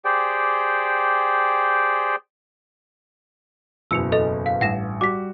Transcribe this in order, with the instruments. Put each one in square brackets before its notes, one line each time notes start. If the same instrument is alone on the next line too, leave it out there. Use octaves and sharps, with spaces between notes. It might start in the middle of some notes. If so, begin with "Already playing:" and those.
[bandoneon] G4 G#4 C5 D5 G5
[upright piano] F#1 E2 B2 [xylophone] E6 C#7 F7
[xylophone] A4 D#5
F5
[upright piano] A1 G2 [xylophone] F#5 A#6 E7
[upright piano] G3 F#4 [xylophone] D6 B6